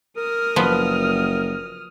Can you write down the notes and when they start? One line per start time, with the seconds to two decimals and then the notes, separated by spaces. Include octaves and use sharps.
0.17 A#4 D#6 F6
0.56 F#1 F3 B3